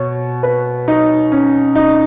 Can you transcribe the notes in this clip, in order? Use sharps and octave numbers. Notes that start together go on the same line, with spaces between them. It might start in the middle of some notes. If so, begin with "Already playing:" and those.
Already playing: B2 C#5
B4
D#4
C#4
D#4